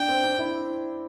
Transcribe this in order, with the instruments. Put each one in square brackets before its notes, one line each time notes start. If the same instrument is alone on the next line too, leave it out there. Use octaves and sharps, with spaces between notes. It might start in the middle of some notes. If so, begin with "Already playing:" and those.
Already playing: [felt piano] D4 [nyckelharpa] G5
[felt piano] C4
D4
E4